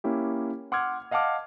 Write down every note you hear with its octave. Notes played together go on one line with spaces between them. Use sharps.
A#3 C#4 E4 G4
F#5 C6 D6 E6 F6 G#6
D#5 F5 F#5 A5 D6 F6